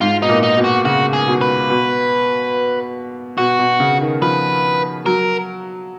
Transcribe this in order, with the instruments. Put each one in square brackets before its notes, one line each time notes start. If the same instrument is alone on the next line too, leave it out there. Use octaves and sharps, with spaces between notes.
[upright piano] G#2 [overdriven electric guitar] F4
[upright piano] B2 [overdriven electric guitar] D#4
[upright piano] A#2
[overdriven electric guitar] D#4
[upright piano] B2
[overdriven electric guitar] F#4
[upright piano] C#3 [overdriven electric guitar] F#4
[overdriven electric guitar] G#4
[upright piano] B2
[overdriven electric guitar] B4
[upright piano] B2
[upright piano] B2 [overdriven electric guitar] F#4
[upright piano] B2
C#3
D#3
[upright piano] F3 [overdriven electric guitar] B4
[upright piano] F#3 [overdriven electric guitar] A#4